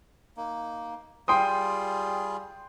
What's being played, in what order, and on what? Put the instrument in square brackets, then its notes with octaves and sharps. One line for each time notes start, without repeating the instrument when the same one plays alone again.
[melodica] A#3 D#4
[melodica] G3 F4 G#4 [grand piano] G5 C6 D#6